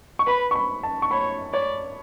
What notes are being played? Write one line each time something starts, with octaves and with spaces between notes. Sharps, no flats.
C#6
B4 B5
C#6
B5
A5
C#6
C#5 B5
C#5 D5